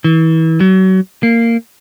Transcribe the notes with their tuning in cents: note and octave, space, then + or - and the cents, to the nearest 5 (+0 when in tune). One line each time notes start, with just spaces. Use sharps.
E3 -30
F#3 +30
A#3 -15